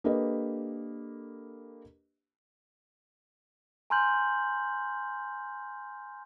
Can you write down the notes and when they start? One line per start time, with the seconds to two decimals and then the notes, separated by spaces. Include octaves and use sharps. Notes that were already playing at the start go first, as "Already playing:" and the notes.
0.04 A#3 D4 G4 A4 B4 D#5
3.90 G#5 A#5 C6 F6 G6 F#7